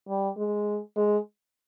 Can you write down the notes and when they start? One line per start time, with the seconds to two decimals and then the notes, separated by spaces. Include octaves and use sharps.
0.09 G3
0.38 G#3
0.97 G#3